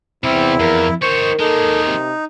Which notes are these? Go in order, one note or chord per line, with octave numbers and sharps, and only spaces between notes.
E2 C3 G3 C4 E4
F2 A#4
D#3 D#4 A#4 C5 C#5 C#6
G#3 A#3 D#4 A4
C3